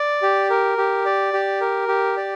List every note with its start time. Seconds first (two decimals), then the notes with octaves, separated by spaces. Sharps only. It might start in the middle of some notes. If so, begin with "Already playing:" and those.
Already playing: D5
0.22 G4
0.50 A#4
0.78 G4
1.06 D5
1.33 G4
1.61 A#4
1.88 G4
2.17 D5